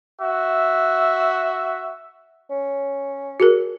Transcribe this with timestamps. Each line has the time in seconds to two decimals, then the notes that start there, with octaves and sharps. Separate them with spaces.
0.21 F#4 E5
2.50 C#4
3.40 F#4 G#4 A#4